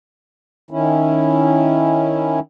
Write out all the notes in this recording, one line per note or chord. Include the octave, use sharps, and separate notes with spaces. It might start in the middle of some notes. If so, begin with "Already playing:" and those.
D#3 C#4 E4